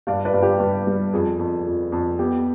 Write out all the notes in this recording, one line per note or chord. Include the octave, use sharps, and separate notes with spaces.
G2 D5 F5
B4 D5
G2
G4 B4
G2
G3
F2 G#4
F2
F2
F2
B3 G4